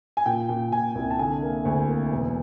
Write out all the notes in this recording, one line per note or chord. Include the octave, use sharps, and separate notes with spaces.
G#5
A#2 G5
A#2
A#2 G#5
C2
A5
D3 G#5
A#3
D2
A#3
E1